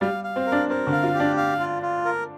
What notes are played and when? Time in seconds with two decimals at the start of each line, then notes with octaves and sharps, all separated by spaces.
0.01 G3 F5
0.24 F5
0.36 C4
0.47 A#4
0.52 D4
0.69 C4 A#4
0.87 D3
0.92 F5
1.03 F4
1.14 G4
1.20 D4
1.37 F5
1.60 F4
1.82 F4
2.05 A#4